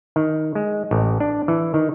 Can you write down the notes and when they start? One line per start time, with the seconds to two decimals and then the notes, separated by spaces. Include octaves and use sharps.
0.16 D#3
0.55 G#3
0.91 A1
1.20 D4
1.48 E3
1.74 D#3